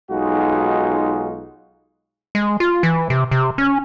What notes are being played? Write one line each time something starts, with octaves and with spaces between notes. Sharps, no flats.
B1 G#3 D#4 F4 F#4
G#3
F4
E3
C3
C3
C#4